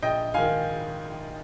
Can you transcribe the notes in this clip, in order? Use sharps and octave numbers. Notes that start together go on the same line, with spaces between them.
A#1 D#5 G5
G#2 D#3 F5 G#5